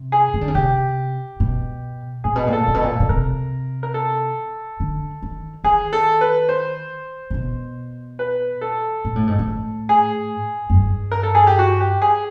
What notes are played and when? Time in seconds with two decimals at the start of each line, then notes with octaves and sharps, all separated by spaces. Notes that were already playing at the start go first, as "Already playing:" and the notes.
Already playing: C3
0.12 G#4
0.34 D#3
0.41 D3
0.48 C#3
0.55 C3 G4
1.40 B2
2.24 A#2 G#4
2.36 B2
2.47 A#2
2.53 A4
2.68 A#2
2.74 B2
2.81 A#2 A4
3.00 B2
3.09 C3 A#4
3.83 A#4
3.94 A4
4.80 D3
5.22 D#3
5.64 D#3 G#4
5.93 A4
6.21 B4
6.49 C5
7.30 C3
7.34 B2
8.19 B4
8.61 A4
9.05 A#2
9.16 A2
9.27 G#2
9.39 A2
9.89 G#4
10.70 F#2
10.74 G2
11.12 A#4
11.23 A4
11.35 G#4
11.47 G4
11.59 F#4
11.81 G4
12.02 G#4